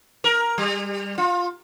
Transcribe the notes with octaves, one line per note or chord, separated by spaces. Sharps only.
A#4
G3
F4